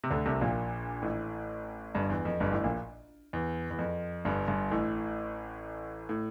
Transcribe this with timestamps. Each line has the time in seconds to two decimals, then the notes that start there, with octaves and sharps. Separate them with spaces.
0.04 C3
0.10 D2 D3
0.26 C2 C3
0.41 A#1 A#2
1.02 A1 A2
1.95 G1 G2
2.10 E2
2.25 F2
2.40 G1 G2
2.52 A1 A2
2.64 A#1 A#2
3.33 E2
3.71 E2
3.79 F2
4.25 G1 G2
4.47 G1 G2
4.71 A1 A2
6.09 A2